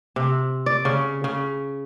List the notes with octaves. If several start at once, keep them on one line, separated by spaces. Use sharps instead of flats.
C3
D5
C#3
C#3